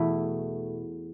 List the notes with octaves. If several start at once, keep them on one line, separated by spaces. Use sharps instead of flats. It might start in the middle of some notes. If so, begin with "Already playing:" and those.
Already playing: E2 B2 A3 E4